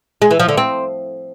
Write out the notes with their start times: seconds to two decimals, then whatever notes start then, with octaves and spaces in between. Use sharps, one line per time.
0.22 G#3
0.31 E3
0.40 F3
0.49 D3
0.57 C4